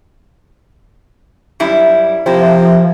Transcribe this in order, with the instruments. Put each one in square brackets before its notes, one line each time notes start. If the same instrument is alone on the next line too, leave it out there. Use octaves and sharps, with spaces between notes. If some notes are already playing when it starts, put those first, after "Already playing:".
[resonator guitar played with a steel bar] F#2 G3 E4
[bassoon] C3 [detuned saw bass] F3 [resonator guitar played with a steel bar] A#3 E4